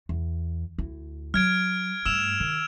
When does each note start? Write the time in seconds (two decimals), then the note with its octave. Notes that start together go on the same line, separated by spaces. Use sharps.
0.09 E2
0.78 D2 E4
1.34 F#3 F6 G#6 D7
2.06 G2 A3 E6 E7 F7
2.40 D#3